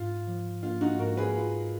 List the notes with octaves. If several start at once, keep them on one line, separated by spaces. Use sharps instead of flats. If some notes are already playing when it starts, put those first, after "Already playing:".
Already playing: G#2 F4
F3
A#3 F4
D#4 F#4
G#2 F#4 A#4
G#4 B4
F4